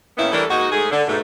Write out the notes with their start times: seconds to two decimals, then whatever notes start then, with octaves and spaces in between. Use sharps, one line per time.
0.18 A2 D#3 A#3 B3 C#4 E4
0.32 E3 G3 A3 D4 A4 A#4
0.50 G#2 A#3 D#4 F#4
0.72 G#2 G#3 A3 G#4
0.92 D3
1.07 G#2 B2 A3